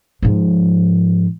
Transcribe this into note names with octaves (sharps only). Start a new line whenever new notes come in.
G#2 F3